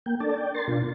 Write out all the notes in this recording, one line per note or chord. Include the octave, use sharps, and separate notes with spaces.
A#3 G5
D4 A4 D5 A5
D5 G5
A#4 C6 A6
B2 D4 F4